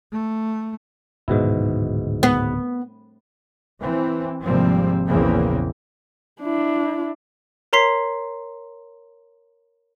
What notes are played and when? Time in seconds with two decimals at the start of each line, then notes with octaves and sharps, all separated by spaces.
0.12 A3
1.28 D1 G#2 B2 D#3 E4
2.23 B3
3.80 E3 C4
4.44 G#1 C3 F3 G3 A#3 C4
5.08 A#1 E2 C#3 E3 A#3 C4
6.42 D4 E4
7.73 A#4 C#5 A#5 C6 B6 C7